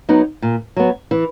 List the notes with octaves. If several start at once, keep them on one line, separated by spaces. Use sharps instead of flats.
F#3 B3 D#4
A#2
F#3 B3
E3